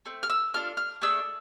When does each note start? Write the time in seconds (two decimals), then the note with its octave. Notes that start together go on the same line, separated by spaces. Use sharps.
0.06 A3 C4
0.23 F6
0.30 E6
0.54 D4 F4 A4 F6
0.77 F6
1.02 A3 D4 G#4 E6